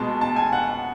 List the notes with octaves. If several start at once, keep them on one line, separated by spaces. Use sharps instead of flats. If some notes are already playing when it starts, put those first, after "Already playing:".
Already playing: B2 G#3 A5
A5
G#5
F#5